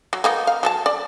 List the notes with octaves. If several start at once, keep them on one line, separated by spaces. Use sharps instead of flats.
F#3
A#3 B3 D#4
F5
F#3 A4 A5
D5